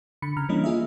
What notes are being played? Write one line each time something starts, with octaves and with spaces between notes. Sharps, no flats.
D3 B5 C#7
C#3 A#5 F6
E3 G3 A#3 C#4 D4 D#5
A#3 F4 G#4 D#5 E5